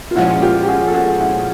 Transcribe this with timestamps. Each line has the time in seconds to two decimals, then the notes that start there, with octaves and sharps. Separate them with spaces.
0.11 F4
0.15 A#2 F3 G#3 C#4 E4 F#4
0.42 F4 G4
0.63 G4
0.68 F#4 G#4
0.87 A4
0.94 F#4 G#4
1.20 E4 F#4